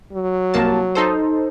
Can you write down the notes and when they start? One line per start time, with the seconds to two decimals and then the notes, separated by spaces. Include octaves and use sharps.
0.13 F#3
0.54 C2 A#3 A5
0.95 D#4 A4 C5